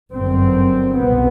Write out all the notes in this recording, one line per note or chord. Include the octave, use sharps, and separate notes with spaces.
G1 F#2 C4
C2 B2 B3